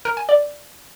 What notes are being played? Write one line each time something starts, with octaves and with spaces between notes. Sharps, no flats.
A#4
G#5
D5